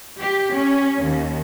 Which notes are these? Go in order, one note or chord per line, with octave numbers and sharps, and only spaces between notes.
G4
C#4
D#2